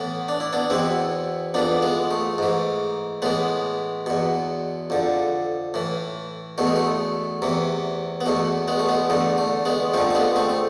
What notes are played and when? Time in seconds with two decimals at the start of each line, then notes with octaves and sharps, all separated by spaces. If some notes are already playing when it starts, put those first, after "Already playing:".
Already playing: A2 E3 B3
0.28 D4
0.40 E4
0.53 B3 D4
0.70 E2 B2 C4 E4
1.54 F2 E3 B3 D4
1.82 G#3 B3
2.11 A3
2.38 G#2 E3
3.22 A2 E3 G#3 B3
4.06 E2 B2
4.90 F2 D3
5.74 A2 E3
6.58 E2 B2 A3
6.67 G#3
6.76 A3
7.42 E2 C3 E3
8.21 B3
8.26 E2 B2 A3
8.68 G#3 B3
8.79 A3
8.89 G#3 B3
9.10 E2 D3 A3
9.38 A3
9.65 G#3 B3
9.94 F2 D3 A3 C4
10.11 A3
10.15 G#3 B3
10.36 A3 C4
10.49 A3